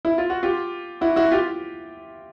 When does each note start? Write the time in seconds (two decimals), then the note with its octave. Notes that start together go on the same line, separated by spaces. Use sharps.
0.05 E4
0.18 F4
0.30 F#4
0.43 F4 G4
1.01 E4 F#4
1.16 E4 F#4
1.31 F4 G4